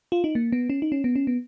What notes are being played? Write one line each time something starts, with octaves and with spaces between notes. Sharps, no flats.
F4
D#4
A#3
B3
C#4
D#4
C#4
B3
C#4
B3